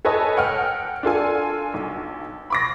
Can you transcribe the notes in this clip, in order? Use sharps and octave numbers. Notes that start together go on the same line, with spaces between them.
A4 B4 C#5 D#5 G#5 A5
F#5 G5 F6
D4 F4 A4 G#5
B1
B5 D6 A#6